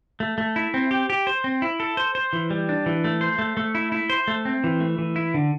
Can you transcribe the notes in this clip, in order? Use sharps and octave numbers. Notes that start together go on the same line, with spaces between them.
A3
A3
E4
C4
G4
G4
C5
C4
E4
A4
C5
C5
E3
G3
D4
E3
A3
C5
A3
A3
E4
E4
C5
A3
C4
E3
A3
E3
E4
D3